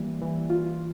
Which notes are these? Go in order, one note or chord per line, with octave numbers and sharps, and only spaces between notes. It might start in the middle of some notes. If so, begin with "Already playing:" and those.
Already playing: E3 G3 A#3
E3
F4